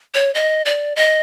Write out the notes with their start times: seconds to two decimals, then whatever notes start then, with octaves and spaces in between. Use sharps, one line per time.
0.14 C#5
0.35 D#5
0.65 D5
0.96 D#5